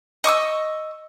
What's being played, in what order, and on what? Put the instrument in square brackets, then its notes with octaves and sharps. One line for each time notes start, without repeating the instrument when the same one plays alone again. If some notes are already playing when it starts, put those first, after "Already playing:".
[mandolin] D#5 C#6 D6 E6